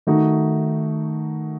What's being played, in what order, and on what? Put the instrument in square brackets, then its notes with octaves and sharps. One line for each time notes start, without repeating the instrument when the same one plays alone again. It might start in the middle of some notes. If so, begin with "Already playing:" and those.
[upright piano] D#3 A3 D#4 F#4